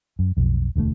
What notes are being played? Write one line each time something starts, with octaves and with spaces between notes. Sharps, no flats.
F#2
B1 F2
E1 D2 D3 A3